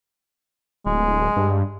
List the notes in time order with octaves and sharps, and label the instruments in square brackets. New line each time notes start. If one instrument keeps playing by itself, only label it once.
[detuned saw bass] D1 [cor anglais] G#3
[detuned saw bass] G2